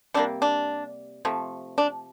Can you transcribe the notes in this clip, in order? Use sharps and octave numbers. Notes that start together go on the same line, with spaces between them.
C3 G3 A#3 D4
D4
C3 F3 A3
D4